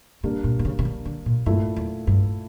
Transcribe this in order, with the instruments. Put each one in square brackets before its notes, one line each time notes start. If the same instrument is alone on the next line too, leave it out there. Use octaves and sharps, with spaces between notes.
[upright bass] C#3 [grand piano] G3 A#3 D4
[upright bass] A#2
A#2
C#3
C#3
D3
D3
A#2
[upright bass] G2 [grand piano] A#2 A3 E4
[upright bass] E2
G2